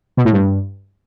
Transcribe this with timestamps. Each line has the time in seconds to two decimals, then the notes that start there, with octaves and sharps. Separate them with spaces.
0.17 B2
0.25 A2
0.33 G2